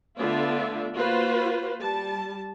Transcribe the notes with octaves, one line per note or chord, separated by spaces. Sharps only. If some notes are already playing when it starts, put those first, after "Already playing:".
D3 A3 B3 F4 D5 E5
A#3 F4 F#4 B4 C5
G3 A5